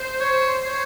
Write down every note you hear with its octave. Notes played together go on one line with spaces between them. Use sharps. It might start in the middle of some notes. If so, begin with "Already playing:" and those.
Already playing: C5
C#5
C#5